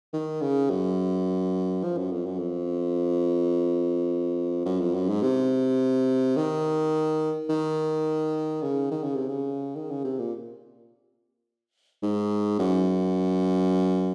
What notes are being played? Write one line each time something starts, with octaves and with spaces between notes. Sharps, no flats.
D#3
C#3
F#2
F3
F#2
F2
F#2
F2
F#2
F2
F#2
G#2
C3
D#3
D#3
C#3
D#3
C#3
C3
C#3
D#3
C#3
C3
A#2
G#2
F#2